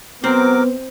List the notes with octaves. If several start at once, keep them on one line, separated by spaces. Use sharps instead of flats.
F#3 B3 C4 A#4 C5 D6